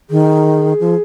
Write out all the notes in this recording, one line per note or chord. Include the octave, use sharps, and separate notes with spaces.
D#3 G#4
F3